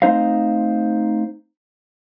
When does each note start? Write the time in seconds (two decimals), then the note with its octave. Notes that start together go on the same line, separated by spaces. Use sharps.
0.02 A3 C4 D#4 C5 D#5 F5